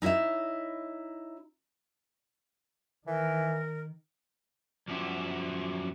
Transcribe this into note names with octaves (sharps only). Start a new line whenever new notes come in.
D#4 E4 C#5 D#5 E5
D#3 E3 A#4
F#2 F3 B3 E4 G4